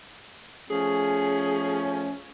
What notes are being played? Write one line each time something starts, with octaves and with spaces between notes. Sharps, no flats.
F3 A3 C#4 G#4